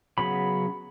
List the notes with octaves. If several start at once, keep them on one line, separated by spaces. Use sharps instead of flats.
C#3 F#3 B3 B5